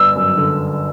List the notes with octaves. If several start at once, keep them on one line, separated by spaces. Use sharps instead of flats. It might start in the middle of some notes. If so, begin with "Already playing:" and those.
Already playing: G1 E6
F#2
D3